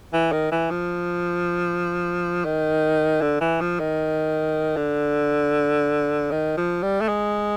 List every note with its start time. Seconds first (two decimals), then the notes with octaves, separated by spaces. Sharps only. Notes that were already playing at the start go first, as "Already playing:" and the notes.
0.13 E3
0.32 D#3
0.51 E3
0.71 F3
2.45 D#3
3.21 D3
3.41 E3
3.61 F3
3.80 D#3
4.76 D3
6.31 D#3
6.57 F3
6.82 G3
7.01 A3
7.08 G#3